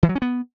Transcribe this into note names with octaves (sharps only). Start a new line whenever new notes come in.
E3
F#3
C#4
B3